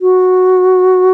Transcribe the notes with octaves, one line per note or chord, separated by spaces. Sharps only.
F#4